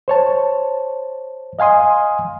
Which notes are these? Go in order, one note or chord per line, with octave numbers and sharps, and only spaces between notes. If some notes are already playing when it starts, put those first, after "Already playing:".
C5 C#5 A5
D#5 F5 G#5 C6 D#6